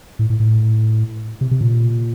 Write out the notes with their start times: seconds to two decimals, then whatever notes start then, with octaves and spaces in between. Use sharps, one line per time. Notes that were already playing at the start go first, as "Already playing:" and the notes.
0.19 A2
0.30 A2
0.40 A2
1.41 C3
1.51 C3
1.61 A#2